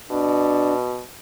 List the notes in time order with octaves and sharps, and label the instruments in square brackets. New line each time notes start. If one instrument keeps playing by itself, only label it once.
[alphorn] B2 [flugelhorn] D4